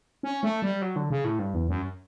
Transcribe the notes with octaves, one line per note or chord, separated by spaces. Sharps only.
C#4
A3
G3
F#3
D3
C#3
A2
G2
E2
F#2